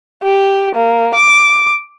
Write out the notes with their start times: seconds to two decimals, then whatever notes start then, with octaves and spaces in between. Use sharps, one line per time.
0.23 G4
0.75 A#3
1.14 D6